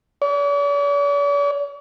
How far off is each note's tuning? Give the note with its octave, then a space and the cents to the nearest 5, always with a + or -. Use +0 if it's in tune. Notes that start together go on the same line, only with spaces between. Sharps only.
D5 -45